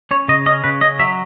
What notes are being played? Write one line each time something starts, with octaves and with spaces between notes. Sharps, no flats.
C#4 C#5
C#3 D#5
C#4 D#5
C#3 B4
C#4 D#5
F#3 E5